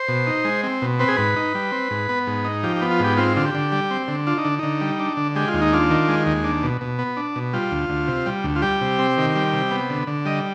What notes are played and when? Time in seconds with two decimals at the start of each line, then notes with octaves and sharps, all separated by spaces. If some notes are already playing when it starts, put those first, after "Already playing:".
Already playing: C5
0.08 B2
0.27 D#4
0.45 G#3
0.63 C4
0.82 B2
0.99 C4 B4
1.08 G#4
1.17 G#2 B4
1.36 D#4
1.55 G3
1.72 C4
1.91 G#2
2.09 B3
2.27 G#2
2.45 D#4
2.63 F3 G4
2.76 G4
2.82 B3
2.91 F4
3.00 G#2 G4
3.17 C4 F4
3.36 D3 F4
3.45 G4
3.55 D3
3.72 G3
3.91 C4
4.08 D3
4.27 D4 F4
4.38 D#4
4.45 D3
4.59 D3 D#4
4.81 G3
4.99 D4
5.17 D3
5.36 G#3 G4
5.48 F4
5.54 D#2
5.62 D#4
5.72 D4 F4
5.90 D#3
6.08 G#3
6.26 D#2
6.44 D4
6.63 B2
6.81 B2
6.99 B3
7.17 D4
7.36 B2
7.53 G3 F4
7.71 D2
7.89 D2
8.08 C3
8.26 G3
8.44 D2
8.56 F4
8.62 G3 G4
8.81 C3
8.99 C4
9.18 D#3
9.36 G3
9.53 C3
9.71 B3
9.90 D3
10.07 D3
10.25 G3 D#5